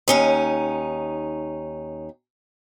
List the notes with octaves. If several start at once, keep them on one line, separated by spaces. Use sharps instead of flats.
D#2 C#4 D#4